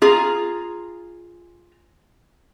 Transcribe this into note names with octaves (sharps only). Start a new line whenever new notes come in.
F4 G#4 A#5